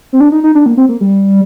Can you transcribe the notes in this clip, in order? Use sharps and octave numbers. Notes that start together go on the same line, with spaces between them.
C4
D4
D#4
D#4
D4
A#3
C4
A#3
G3